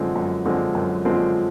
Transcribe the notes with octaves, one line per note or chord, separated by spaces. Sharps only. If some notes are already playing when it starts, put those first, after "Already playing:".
Already playing: F#2 D3 F3 G#3 C4
F#2
D3 F3 G#3 C4
F#2
D3 F3 G#3 C4